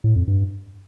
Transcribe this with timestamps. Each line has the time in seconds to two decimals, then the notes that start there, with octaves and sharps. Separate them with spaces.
0.04 A2
0.16 F2
0.28 G2